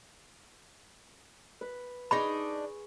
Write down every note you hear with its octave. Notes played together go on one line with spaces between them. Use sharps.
B4
D4 D#4 G#4 D#5 B5 C#6